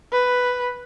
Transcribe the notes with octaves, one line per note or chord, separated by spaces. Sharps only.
B4